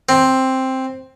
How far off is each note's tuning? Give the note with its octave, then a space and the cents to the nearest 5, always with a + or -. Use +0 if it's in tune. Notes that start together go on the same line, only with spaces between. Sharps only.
C4 +5